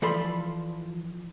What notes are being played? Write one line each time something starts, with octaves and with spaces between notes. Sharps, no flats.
E3 F3 A4 D5 B5 C6